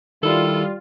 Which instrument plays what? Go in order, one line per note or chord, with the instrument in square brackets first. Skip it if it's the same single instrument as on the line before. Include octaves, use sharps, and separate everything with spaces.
[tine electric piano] D#3 E4 [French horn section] G3 [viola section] F4 [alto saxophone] A4